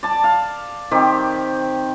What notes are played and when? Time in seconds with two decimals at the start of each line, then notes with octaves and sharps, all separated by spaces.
0.03 D5 A5
0.24 F5
0.91 D#3 C4 G4